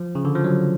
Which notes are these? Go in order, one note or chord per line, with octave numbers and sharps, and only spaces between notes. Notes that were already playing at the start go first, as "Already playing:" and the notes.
Already playing: F3
C#3
D3
F3
F#3